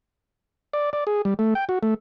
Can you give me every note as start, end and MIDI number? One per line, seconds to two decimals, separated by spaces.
0.73 0.90 74
0.93 1.04 74
1.07 1.22 68
1.25 1.34 55
1.39 1.54 57
1.55 1.65 79
1.69 1.79 66
1.83 1.94 57